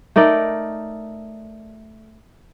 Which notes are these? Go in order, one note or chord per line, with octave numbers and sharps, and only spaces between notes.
A3 D#4 A#4 D5